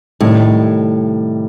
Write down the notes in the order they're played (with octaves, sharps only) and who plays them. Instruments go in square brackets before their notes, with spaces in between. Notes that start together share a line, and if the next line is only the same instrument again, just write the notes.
[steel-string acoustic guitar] A2 [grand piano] C3 D#3 G3 D#4